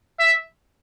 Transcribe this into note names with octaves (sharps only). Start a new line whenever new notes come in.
E5